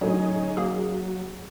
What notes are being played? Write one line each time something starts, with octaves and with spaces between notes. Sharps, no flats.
A2 D3 F#3 C#4 D#4 G#4
F#3 A#3 G#4